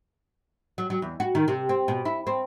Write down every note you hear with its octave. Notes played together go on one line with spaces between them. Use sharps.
F#3
F#3
E2
F#4
D#3
C3
C4
B2
E4
C4